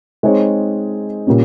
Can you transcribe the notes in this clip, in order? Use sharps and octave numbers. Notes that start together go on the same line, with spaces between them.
G#3 C4 D#4 G#4 C#5
A#2 G3 A#3 C#4